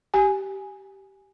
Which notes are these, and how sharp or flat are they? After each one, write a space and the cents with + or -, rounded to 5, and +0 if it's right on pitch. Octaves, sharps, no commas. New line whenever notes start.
G4 -15 G#5 +0